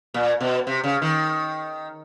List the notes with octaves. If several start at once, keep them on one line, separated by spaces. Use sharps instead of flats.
A#2
B2
C3
C#3
D#3